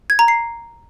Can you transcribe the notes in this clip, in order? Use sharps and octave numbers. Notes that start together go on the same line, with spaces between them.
G#6
A#5
C7